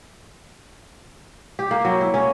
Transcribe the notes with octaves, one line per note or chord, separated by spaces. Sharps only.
G4
A#3
F#3
E4
C#4